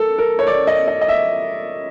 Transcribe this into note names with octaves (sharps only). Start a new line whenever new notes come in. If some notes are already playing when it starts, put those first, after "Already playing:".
Already playing: A4 A#4
A#4
C#5
D5
D#5
D#5
D#5
E5